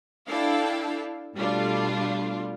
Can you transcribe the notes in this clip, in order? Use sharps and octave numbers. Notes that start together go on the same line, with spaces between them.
D4 E4 A4 F5 G5
B2 G3 A3 D4 F4